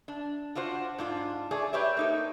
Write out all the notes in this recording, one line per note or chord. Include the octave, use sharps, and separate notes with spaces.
D4
D4 F4 F#4 C5
G#2 D4 F4
A3 G#4 D5
G4 B4 C#5 D5 E5
A#3 D#4 A4